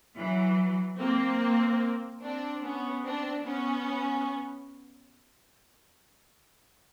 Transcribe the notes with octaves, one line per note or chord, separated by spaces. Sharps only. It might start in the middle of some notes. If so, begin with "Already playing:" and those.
E3 F#3
A#3 C4
C4 D4
B3 C#4
C4 D4
B3 C#4